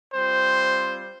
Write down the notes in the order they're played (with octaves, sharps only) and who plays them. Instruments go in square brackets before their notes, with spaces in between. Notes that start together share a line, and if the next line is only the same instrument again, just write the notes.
[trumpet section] G3 C4 F4 C5